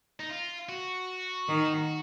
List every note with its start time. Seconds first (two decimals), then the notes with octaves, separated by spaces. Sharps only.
0.20 D#4
0.30 F4
0.69 F#4
1.48 D#3